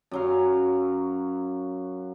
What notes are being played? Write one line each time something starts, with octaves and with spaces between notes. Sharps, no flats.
F#2 F#3 F5